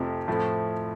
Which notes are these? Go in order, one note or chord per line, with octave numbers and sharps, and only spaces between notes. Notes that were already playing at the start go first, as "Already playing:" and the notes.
Already playing: F2 C3 F3 A3
A2 F3 A3 C4 E4